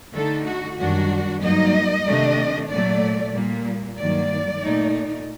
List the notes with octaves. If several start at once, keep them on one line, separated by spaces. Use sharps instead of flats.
D3 A3 D#4 A4
F#4
F#2 D#3 G3 D4 F#4
G2 F#3 A#3 D#4 D#5
C3 D#3 A3 D4
A#2 F#3 A3 D5
A#2 G3 A#3
G2 D#3 F#3 A#3 D5
A#2 A3 D#4